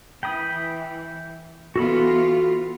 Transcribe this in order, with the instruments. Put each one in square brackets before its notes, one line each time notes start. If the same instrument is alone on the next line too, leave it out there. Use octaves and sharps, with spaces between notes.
[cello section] E3 [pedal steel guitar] G5 B5 D#6
[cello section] E3 B3 F4 [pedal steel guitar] F#4 A4 B5